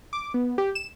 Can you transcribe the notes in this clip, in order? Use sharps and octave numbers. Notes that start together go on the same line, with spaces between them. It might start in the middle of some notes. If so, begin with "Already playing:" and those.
D6
B3
G4
E7